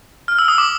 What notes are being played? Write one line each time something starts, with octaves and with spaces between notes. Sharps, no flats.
F6
E6
D#6
D6